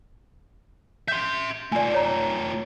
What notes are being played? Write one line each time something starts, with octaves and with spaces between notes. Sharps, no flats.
E5 C6 G6
A3 F4 D5 G#5
C#5 A#5